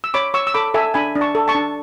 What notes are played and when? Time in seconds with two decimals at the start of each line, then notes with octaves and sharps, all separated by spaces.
0.04 E6
0.14 C#5 B5 D6
0.34 C#5 C#6 E6
0.47 E6
0.54 A4 B5 D6
0.74 A4 E5 G#5
0.94 D4 G#5 B5
1.15 D4
1.21 A5 C#6
1.35 A4
1.48 A5 C#6
1.55 D4